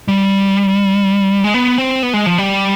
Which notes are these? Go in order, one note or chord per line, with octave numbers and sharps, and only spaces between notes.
G3
G#3
B3
C4
B3
G#3
F3
G3